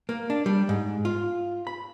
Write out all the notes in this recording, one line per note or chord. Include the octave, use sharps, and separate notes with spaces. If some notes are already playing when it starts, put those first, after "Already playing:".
A#3
D4
G3
G#2
F4
B5